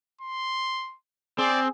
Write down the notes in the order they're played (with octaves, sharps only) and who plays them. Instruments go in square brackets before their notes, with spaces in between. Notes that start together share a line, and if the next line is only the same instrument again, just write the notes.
[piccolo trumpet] C6
[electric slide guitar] C4 [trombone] G#4 [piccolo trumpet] D5